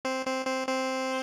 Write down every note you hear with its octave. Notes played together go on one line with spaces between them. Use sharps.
C4 C5
C4 C5
C4 C5
C4 C5